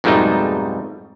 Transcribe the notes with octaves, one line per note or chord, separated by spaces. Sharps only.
F2 G#2 B2 G3 A3 D#4